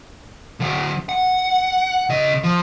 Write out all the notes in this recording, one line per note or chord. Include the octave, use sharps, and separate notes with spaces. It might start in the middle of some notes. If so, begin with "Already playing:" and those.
D3 F#3
F#5
C#3 D#5
F3